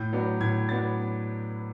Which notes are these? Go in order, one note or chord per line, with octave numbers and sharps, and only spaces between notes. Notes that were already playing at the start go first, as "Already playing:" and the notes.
Already playing: A2 G6
F#3 B3 D4
A2 G#6
F#3 B3 D4 A6